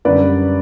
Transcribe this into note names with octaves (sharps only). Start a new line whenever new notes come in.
F#2 D3 G3 B4 D5